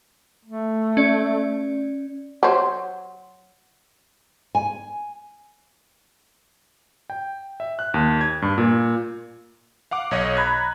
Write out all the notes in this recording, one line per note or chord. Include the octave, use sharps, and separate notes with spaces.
A3
C#4 D5
F#3 C5
G#5
G5
E5
F#6
D#2
G#6
G2
A#2
F5 F#5 D6
B1 C#5 D#5
A#5 B5 F#6 G#6